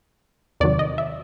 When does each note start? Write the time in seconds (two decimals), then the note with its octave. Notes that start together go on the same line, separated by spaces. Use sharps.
0.60 E2 C3 D#3 F#3 D5
0.79 D#5
0.98 E5